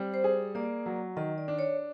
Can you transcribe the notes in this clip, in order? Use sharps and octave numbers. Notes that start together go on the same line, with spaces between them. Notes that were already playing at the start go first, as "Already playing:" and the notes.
Already playing: G3 C4
C5
G#4
A#3 D5
F#3
D#3 D#5
D5
D4
C#5